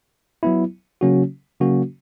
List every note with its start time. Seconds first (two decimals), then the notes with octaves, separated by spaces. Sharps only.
0.43 F#3 B3 E4
1.01 C#3 F#3 A#3 C#4 F#4
1.60 C#3 F#3 A#3 C#4 F#4